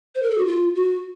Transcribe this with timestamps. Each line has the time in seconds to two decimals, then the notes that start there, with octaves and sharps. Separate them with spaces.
0.15 C5
0.23 A#4
0.31 A4
0.38 F#4
0.47 F4
0.75 F#4